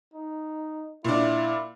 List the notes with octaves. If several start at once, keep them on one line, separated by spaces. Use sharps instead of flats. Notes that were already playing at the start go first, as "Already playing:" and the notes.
D#4
A#2 D4 E4